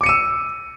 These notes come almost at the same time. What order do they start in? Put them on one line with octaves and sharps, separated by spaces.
D6 C#7 D#7 E6